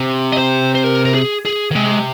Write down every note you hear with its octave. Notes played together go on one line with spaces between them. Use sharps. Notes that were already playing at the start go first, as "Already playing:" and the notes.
Already playing: C3
D#5
C5
C5
A#4
A#4
G#4
G#4
D#3
C3 G#3